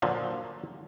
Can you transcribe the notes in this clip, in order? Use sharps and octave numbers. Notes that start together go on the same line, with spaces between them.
A#2 D3 F3 F#3